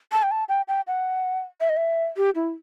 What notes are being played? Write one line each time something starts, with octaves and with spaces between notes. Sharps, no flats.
A5
G5
A5
G5
G5
F#5
E5
D#5
E5
G4
E4